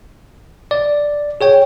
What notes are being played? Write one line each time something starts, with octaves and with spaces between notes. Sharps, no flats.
D5
G#4 C#5 G5